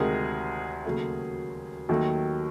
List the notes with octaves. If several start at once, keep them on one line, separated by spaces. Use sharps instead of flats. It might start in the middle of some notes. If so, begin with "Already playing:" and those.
Already playing: D2 C3 D#3 G#3 G#4 A#4
D#2 C#3 F#3 A3
D#2 D#3 F#3 A3